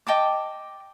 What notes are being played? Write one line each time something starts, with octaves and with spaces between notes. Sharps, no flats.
D#5 G5 A5 D6